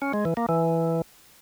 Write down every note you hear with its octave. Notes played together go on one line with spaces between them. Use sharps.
C#4
G#3
E3
A#3
E3